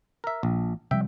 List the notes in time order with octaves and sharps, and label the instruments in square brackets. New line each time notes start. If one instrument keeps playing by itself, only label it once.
[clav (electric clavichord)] A#4 E5
A#1
[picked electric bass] C3 F3 G3 [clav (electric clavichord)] E5 G5